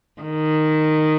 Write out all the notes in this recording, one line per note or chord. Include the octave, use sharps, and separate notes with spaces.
D#3